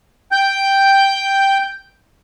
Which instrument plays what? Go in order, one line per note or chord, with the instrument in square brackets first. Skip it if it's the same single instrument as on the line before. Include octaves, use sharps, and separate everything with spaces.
[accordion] G5 G6